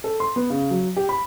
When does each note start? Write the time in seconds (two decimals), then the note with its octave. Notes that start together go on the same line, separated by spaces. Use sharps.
0.04 A4
0.20 C6
0.36 B3
0.50 C#3
0.71 F#3
0.96 G4
1.09 B5